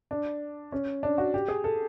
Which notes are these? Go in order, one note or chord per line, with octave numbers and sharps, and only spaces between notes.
D4
C#4
D4
F#4
G4
G#4
A4